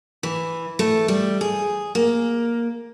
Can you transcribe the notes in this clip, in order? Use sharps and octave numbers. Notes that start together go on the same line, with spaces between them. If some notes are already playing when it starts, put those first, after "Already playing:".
E3
A3
G3
G#4
A#3